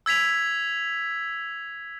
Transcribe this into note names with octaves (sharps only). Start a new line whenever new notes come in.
E6 G#6 B6 F7